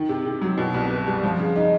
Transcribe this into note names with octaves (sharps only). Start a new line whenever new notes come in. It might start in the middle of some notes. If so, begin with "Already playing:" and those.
Already playing: D#3
C3
C3
F#3
B2
C2
B3
G3
F3
C#3
D#4